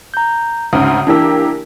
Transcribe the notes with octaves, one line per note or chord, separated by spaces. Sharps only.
A#5 G6
D2 G#2 C#3 D#6
E3 A#3 D4 G4 E6